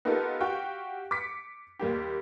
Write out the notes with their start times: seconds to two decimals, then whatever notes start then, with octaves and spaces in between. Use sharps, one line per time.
0.05 B3 D#4 F4 G4 A4 A#4
0.40 F#4 G4 F5 G5 C#6
1.11 D6 B6 C#7
1.79 D#2 G3 A#3 G4